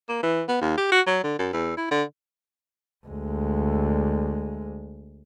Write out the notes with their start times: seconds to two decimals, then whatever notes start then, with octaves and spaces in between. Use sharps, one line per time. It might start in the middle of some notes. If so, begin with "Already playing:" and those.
0.09 A#3
0.23 E3
0.49 B3
0.61 D#2
0.78 G4
0.92 F#4
1.07 F#3
1.24 D3
1.39 F#2
1.53 E2
1.77 E4
1.91 D3
3.07 D2 G#3